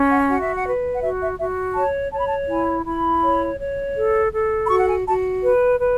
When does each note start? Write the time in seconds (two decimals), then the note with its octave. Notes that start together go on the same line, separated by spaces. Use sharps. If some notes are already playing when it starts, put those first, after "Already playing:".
Already playing: C#4
0.10 F#5
0.28 F#4 F#5
0.41 E5
0.53 F#5
0.66 B4
0.95 F#5
1.02 F#4 E5
1.21 E5
1.39 F#4 E5
1.76 C#5 A5
2.12 C#5 A5
2.20 B5
2.27 A5
2.49 E4 G#5
2.86 E4 B5
3.23 C#5
3.59 C#5
3.97 A4
4.33 A4
4.66 B5
4.69 F#4 C#6
4.80 F#5
4.89 G#5
5.06 F#4 A5
5.43 B4
5.80 B4